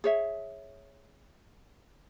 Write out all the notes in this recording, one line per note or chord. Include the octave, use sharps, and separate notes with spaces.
G#4 C#5 E5